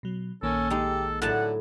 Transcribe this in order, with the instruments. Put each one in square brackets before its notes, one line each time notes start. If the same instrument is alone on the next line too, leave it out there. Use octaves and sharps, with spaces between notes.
[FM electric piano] B2 F#3
[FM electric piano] A#1 D#3 A#3 [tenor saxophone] C#4 [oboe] A4
[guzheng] G#3 D#4 [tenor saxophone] G4
[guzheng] A2 F#3 A5 [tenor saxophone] D3 [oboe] F#5